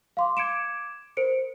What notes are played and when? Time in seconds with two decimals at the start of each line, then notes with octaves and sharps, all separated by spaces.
0.17 F5 C6 D6
0.37 D6 G#6 C#7 D7 E7
1.17 A#4 C5 C#7 D7